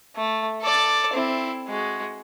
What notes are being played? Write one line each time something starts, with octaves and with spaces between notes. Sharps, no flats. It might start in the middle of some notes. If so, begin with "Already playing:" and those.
A3
A4 D5
C4 E4
G#3 F#4